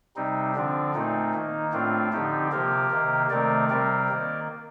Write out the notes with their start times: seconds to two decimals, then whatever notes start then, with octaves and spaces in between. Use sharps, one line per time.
0.16 C3 G3 C4 D#4
0.55 D3 F3 C4 D4
0.94 A#2 A3 C4 D#4
1.34 D#3 A#3
1.73 A2 A3 C4 D4 F4
2.12 D3 F3 C4 D#4 G4
2.52 C3 F3 A#3 G4 A#4
2.91 C3 D#3 A#3
3.30 C3 D#3 A3 C4 A#4 D5
3.70 C3 G3 C4 A#4 D5
4.09 D#3 A#3